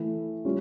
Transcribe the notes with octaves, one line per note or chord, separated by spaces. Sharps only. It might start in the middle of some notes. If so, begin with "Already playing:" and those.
Already playing: E3 A3 E4
G3 C#4 F4